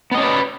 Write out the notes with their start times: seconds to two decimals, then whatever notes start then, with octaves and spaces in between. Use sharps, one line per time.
0.11 B3
0.14 D#5
0.17 C#4
0.20 D5
0.23 B4